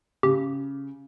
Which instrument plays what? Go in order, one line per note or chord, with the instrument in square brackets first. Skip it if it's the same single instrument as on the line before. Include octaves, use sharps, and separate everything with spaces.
[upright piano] C#3 [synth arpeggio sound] G4